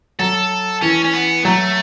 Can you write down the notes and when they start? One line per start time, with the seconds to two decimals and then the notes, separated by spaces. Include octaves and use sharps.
0.19 F#3 A4
0.82 E3 C#4
1.05 C#4
1.14 B3
1.45 F#3 A3